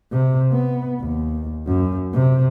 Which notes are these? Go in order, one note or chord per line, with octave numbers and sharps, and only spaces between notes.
C3
B3
D#2
F#2
C3